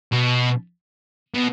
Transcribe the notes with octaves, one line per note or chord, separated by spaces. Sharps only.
B2
B2